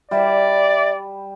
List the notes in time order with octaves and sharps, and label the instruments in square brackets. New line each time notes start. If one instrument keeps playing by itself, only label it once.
[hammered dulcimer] G3 [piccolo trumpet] D5 [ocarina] E5